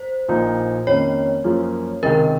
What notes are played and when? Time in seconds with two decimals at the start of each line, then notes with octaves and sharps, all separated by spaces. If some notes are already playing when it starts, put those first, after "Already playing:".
Already playing: C5
0.28 A#1 A#2 F3 A#3 D#4
0.87 F2 D#3 A#3 C#4 C#5
1.44 F#2 F3 A#3 C#4 F4
2.03 C#2 C3 D#3 A#4